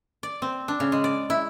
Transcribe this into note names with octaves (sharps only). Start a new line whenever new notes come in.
D5
C4
D4
C#3
G#3
D5
E4